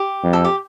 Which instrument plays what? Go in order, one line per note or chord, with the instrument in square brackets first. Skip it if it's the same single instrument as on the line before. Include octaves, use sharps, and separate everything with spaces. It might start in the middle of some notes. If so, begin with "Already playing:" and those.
Already playing: [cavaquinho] G4
[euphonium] F2
[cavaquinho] A4
G4